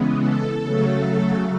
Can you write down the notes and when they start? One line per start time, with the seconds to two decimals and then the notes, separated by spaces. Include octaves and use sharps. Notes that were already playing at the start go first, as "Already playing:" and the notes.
Already playing: C#3 E3 G#3 B3
0.19 A4
0.63 C#3 F#3 A3